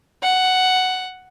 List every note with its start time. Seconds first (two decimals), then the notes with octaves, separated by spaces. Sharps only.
0.23 F#5